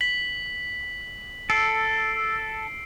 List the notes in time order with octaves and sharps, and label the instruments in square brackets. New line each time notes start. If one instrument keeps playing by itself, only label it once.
[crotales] B6 F#7
[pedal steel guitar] A4 [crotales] E6 C7 D7